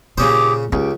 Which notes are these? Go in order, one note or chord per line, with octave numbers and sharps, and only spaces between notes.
A#2 C#3 C#4 G4 C5 D6 D#6
C#2 C#4 G4